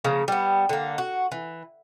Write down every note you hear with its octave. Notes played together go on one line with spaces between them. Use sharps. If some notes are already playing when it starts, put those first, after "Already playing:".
C#3 F3 A#3
G3 B3
D3 A#3
F#4
E3